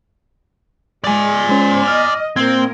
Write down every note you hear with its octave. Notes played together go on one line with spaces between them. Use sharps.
G#3 D5 G#5
G#3 C#4 C5
D#5 F6
A#2 A#3 C4 A#4 G#6